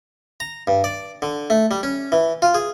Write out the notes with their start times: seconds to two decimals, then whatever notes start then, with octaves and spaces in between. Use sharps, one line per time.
0.40 A#5
0.67 G2
0.84 D5
1.22 D3
1.50 A3
1.71 G3
1.83 C#4
2.12 E3
2.42 F4
2.54 G#4